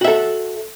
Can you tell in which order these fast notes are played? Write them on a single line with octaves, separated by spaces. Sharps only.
F#4 E5 A4